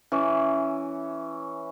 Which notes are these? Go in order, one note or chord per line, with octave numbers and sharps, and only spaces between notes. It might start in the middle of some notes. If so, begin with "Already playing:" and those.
E3 C#4